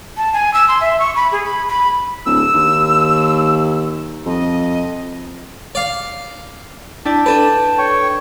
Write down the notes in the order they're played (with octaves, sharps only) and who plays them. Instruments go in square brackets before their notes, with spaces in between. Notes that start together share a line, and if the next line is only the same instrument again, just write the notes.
[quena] A5
G#5
E6
C6
E5
C#6
B5
G#4
B5
B5
[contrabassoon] D1 [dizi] E6
[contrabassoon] D#2
[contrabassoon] F2 [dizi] D#5
[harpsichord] D5 F5
[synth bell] D4 E4 D5 [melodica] G5 A5
[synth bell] D4 A4 D5 [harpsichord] B4
[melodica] C#5 G5 C#6